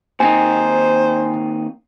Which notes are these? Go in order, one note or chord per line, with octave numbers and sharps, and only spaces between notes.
D#2 C4 D#4 C5 G#5